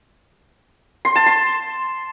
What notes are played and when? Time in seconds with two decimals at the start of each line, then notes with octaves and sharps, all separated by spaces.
1.05 C6
1.16 A5
1.26 C6